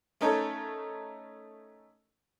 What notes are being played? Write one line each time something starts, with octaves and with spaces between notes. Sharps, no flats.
A3 C#4 D#4 A4 A#4 C#5